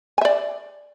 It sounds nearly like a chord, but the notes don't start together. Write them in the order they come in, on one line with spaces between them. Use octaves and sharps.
G#5 E5 D5